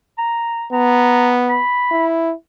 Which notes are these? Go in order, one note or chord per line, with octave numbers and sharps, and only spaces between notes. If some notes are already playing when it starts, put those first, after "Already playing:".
A#5
B3 A#5
B5
E4